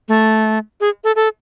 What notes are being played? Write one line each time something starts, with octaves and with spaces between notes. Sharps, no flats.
A3
G#4
A4
A4